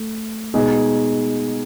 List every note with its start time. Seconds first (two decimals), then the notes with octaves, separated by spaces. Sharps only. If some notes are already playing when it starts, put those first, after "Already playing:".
Already playing: A3
0.54 B2 G#3 B3 D#4 G#4